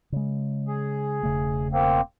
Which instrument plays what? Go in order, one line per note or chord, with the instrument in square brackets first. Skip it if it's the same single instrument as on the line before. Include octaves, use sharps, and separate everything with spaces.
[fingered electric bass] C#3 G#3
[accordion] G#4
[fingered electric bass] E1 C#3 A3
[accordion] A#3 C4